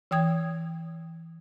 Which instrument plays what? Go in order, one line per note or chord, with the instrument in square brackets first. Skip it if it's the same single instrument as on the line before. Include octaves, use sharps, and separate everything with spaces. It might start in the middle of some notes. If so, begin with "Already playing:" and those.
[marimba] E3 G5 D#6 G#6